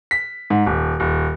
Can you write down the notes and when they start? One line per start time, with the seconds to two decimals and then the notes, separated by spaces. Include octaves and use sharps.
0.11 B6
0.50 G#2
0.66 D#1
1.00 D#1